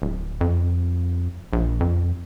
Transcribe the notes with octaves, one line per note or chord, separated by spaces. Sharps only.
D1
F2
A#1
F2